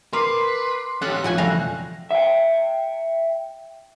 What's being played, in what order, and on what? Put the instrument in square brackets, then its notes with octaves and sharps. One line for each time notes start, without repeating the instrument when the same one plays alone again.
[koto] A#4 [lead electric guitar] B4 [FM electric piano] C6 D6 C7
[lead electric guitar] C#4 G4 [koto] A4 [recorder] F#6
[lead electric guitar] B1 F2 [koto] C#3 F#4 G#5 [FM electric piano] F4
[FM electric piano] E3 G#5 A#6 [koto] G3 A3 F5
[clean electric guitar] E5 G5